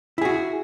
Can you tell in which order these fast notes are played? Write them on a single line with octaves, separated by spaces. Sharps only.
E4 G#4 F#4